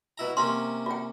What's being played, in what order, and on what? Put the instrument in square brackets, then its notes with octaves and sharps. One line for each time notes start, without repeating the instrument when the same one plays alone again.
[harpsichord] B2 E4 A#5
[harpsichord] C3 A#3 C#4 [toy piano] C6
[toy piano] F4 G5